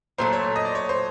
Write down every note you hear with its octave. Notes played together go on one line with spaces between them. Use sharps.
A#2 F#3 A3 C5
C#5
D#5
D5
C#5
C5